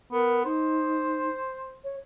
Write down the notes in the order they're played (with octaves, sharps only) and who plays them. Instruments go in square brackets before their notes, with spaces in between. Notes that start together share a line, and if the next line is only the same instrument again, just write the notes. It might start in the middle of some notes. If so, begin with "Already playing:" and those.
[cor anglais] B3 [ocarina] A#4
[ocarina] D#4 [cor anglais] C5
[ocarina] C#5